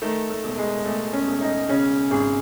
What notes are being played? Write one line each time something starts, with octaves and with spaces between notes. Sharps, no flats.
D#3 A3
A3
E1
G#3
E2 A3
C#4
E1
D#4
C#3 C#4
G#1 G#4